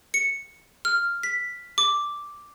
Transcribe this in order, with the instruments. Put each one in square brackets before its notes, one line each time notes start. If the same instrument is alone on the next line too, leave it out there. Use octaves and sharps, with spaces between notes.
[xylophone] C#7
F6
B6
D6